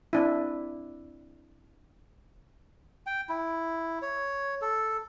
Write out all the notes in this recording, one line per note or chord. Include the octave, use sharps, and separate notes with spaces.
C4 D4 E4
G5
E4
C#5
A4